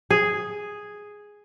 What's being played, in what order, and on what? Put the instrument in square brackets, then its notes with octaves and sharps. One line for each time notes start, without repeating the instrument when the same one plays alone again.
[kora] G#4